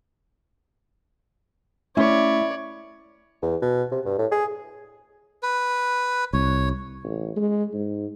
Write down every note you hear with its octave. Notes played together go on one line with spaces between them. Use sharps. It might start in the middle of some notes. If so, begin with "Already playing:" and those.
A3 C#4 E4 C#5 D5
E2
B2
C3
G2
A2
G#4
B4
C2 C#5
A1
G#3
G#2